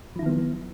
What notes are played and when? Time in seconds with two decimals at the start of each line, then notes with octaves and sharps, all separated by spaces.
0.16 F3
0.19 E4
0.23 D#3
0.26 B3
0.29 F#3